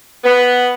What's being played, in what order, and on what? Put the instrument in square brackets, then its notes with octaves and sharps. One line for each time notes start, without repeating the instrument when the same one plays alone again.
[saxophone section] B3